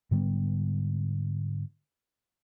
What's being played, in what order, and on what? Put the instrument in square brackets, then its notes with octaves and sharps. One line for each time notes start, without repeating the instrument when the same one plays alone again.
[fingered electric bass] G#2 D3 G3 B3